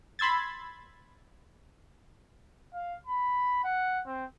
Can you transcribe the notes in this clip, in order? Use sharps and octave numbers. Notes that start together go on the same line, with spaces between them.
B5 C6 E6 G#6 A6
F5
B5
F#5
C4